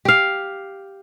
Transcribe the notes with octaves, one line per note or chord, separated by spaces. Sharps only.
G4 F5